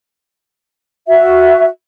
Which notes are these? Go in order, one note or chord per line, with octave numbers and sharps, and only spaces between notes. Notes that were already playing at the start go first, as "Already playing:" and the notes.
F#4 E5